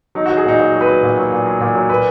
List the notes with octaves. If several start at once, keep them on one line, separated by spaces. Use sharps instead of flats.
F#3 D#4
F#4
F#3
G#4
A#2 D#4
F#3 F#4
F#3
B4
F#3
A#2
F#3
A#2
F#3
A#2
F#3
A#2 B4